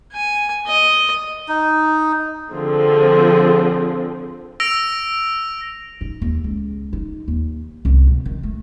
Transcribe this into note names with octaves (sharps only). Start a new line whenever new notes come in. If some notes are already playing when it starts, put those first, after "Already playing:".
G#5
D#5
D#4
D3 F3 C4 G#4
E6 A#6 D7 F7
D#4
D#2
C#2
D#4
D#2
C2
B2
D#3
A3